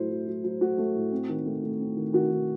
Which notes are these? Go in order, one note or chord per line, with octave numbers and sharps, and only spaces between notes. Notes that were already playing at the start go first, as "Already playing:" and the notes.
Already playing: A2 F#3 A3 E4 C5
F#3
F#3
F#3
A3 F#4
A3
A2
C4
D#3
A3
A3
C4
D#3
D#3 F#4
D#3